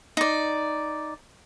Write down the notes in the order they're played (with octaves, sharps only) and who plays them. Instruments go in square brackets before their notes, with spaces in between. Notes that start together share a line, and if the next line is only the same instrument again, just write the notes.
[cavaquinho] D#4 D5